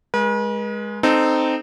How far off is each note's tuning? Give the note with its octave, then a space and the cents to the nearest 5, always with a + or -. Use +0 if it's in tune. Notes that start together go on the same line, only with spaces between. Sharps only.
G#3 +0 B4 -45
C4 -10 D#4 -10 A4 +0